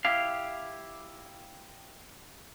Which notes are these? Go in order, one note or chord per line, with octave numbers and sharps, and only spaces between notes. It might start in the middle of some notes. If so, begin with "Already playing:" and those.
E4 G4 F5